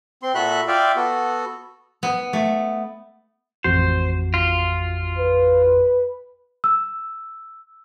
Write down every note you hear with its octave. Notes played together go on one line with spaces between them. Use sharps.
C4 C6
A#2 F#4 A4 E5 B5 F#6
F4 D5 E5 F5 G5
B3 F#4 A4
B3
A3
A1 F2 F#4 C5
F4
B4
E6